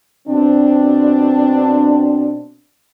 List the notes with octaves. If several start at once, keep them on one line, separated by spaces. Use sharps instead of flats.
B2 C4 D4